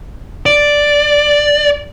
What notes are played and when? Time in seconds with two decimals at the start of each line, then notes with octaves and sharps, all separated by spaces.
0.46 D5